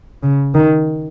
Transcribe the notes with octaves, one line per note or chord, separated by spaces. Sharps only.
C#3
D#3